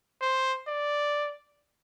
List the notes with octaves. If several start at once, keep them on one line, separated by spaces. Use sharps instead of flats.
C5
D5